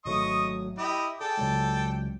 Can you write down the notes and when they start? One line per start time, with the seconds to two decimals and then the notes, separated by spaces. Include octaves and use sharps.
0.05 G#1 F#3 A3 D#5 C#6 D#6
0.78 E4 G4 D#5 D6
1.21 G#4 A4 D5 G5
1.38 C#2 F#3 G#3